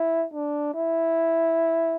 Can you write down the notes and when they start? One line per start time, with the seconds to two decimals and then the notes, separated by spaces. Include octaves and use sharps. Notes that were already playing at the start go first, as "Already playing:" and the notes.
Already playing: E4
0.33 D4
0.74 E4